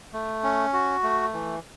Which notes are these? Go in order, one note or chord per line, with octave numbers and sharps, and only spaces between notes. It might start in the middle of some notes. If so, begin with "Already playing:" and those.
A3
C#4
F#4
A3
E3